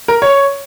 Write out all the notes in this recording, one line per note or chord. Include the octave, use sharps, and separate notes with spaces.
A#4
C#5